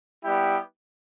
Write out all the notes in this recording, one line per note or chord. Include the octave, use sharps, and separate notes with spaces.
G3 B3 E4 G4